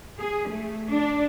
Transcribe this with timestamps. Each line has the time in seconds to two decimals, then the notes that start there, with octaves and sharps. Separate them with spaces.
0.18 G#4
0.49 A3
0.92 D4